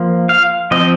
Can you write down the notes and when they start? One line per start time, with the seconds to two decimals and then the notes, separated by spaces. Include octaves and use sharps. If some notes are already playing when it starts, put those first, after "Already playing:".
Already playing: F3 A#3
0.29 F5
0.71 F3 C4 D#5